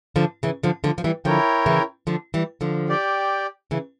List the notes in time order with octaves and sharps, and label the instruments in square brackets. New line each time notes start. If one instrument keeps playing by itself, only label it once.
[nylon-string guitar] D3 F3
C#3 E3
D3 F3
D3 F3
F3
E3 G3
[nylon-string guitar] D3 F3 [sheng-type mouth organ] E4 A#4 C#5 G5
[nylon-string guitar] C#3 E3
D3 F3
E3 G3
D3 F3
[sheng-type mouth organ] G4 D5 G5
[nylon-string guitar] C#3 E3